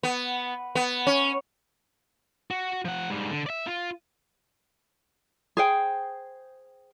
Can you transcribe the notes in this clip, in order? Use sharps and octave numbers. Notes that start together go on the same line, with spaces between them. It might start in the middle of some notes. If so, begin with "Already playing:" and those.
B3
B3
C#4
F#4
F3 F#5
G#2 G3
D3
D5 E5
F4
G#4 C5 G5